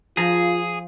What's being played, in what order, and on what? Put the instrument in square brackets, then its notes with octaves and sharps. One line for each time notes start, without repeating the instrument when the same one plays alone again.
[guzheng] F3 A#5 [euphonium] F4 [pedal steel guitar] G#4